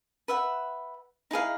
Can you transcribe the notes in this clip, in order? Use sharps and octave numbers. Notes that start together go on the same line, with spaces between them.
B4 E5 F#5
D#4 E4 G#4 F5